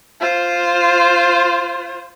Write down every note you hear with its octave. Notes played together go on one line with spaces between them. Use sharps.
F4 C5